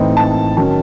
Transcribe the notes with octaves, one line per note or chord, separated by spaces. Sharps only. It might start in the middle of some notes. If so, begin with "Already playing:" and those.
Already playing: A2 E3 C4 D#4
A5
D#3 F#3 C#4 A5